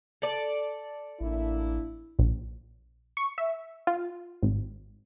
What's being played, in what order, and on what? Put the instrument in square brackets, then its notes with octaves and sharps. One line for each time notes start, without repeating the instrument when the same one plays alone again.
[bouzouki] A4 D5
[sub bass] A1 [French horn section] A#3 D4 E4
[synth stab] A#1
C#6
E5
F4
G#1